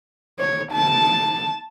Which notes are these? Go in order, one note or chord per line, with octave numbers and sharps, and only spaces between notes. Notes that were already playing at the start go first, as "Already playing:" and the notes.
C#5
A5